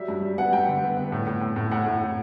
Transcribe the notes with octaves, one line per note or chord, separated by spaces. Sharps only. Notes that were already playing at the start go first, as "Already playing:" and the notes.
Already playing: F#3 G3 E5
G2
G3
B3 F#5
G2 G5
D3
B3
B3
A2
A2
A2
A2
A2 F#5
A2
A2